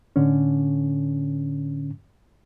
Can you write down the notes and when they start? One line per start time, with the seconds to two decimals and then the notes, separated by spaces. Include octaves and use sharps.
0.16 A2 D3 C#4